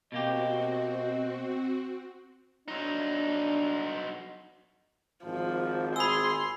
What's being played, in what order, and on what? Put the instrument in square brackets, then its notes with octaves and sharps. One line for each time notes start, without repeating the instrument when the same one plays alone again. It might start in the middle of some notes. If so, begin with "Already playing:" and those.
[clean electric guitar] B2 A#3 G4 [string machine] C4 F#4 [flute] D#5
[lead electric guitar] F#3 D#4 [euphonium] D4
[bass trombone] G#1 [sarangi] F3
[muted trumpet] G#4 [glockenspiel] B5 E6 [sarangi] C6